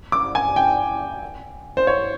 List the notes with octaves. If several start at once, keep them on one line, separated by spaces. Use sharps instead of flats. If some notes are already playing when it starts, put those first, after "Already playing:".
D6
G#5
G5
C5
C#5